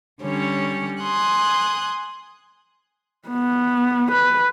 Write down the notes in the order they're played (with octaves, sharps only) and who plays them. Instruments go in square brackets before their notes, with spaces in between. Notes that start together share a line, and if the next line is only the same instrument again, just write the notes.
[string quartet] D3 G3 C#4 C#5
G#5 C6 D#6 F#6
[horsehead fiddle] B3
B4